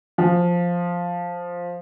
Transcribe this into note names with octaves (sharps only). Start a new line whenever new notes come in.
F3